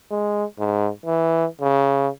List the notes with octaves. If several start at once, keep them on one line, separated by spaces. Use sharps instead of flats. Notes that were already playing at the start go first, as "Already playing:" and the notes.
G#3
G#2
E3
C#3